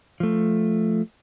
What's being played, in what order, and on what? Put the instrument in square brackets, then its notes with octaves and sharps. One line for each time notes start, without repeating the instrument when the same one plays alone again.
[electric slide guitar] F3 A3